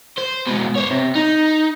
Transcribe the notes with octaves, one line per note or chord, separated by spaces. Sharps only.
C5
G#2 B2
C5 C#5
C3
D#4